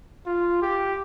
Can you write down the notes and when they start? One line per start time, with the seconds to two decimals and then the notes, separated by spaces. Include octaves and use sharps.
0.26 F4
0.62 G4